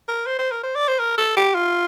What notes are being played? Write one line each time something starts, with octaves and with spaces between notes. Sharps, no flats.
A#4
C5
C5
A#4
C5
D5
C5
A#4
A4
G4
F4